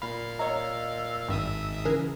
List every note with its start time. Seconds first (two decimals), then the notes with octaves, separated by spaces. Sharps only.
0.02 A#2 F5 B5
0.39 C#5 D#5 A#5 E6
1.28 G#1 G2 E5 D#6
1.85 C#3 E3 G#4 A#4 B4